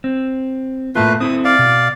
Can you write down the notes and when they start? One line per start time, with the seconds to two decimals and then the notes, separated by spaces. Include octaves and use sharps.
0.04 C4
0.95 A2 A3 A#3 F4 B4
1.20 C4 E4 A4 D#6
1.45 D5 F5
1.59 B2